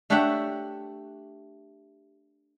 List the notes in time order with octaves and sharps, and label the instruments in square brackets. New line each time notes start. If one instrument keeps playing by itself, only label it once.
[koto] A3 D4 G4 C#5 E5 F#5